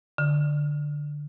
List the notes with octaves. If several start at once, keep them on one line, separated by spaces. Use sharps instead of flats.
D3